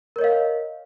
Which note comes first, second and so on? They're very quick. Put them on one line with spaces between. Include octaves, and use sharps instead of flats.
A#4 C#5 D#5 F5